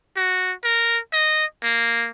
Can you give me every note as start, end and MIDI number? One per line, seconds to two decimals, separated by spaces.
0.16 0.52 66
0.64 0.99 70
1.13 1.44 75
1.64 2.09 58